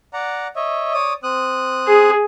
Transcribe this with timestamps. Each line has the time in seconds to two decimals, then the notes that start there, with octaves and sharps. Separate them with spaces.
0.13 D5 F#5 A#5
0.56 C#5 D#5 E5
0.94 C#5 D5 D#6
1.23 C4 D#6 F#6
1.87 G#4